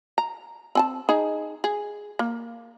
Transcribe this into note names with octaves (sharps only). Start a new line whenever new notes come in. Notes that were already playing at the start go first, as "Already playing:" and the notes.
A#5
C4 G#5 A5
D#4 G#4
G#4
A#3